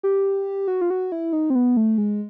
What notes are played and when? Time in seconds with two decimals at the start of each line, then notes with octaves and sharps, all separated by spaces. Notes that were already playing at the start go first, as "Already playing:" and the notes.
0.03 G4
0.68 F#4
0.81 F4
0.90 F#4
1.12 E4
1.33 D#4
1.50 C4
1.55 B3
1.77 A3
1.98 G#3